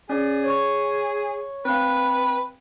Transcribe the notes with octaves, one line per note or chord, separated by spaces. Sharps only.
C#4 G#4 D5
C#5 C#6
C4 B4 F5